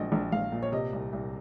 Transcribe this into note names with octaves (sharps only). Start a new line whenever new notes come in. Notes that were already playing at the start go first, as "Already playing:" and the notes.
Already playing: A#1 A#2 F#3 D#5
A#1
A#1 F5
A#2
C#5
C3 D#5
C2
C2